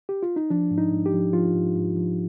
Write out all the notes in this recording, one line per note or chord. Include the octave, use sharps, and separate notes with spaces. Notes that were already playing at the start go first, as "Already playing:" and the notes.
G4
F4
D#4
F3 D4
G#2
D#4
G#2
G4
F3
F3 F4
G#2
G#2
F3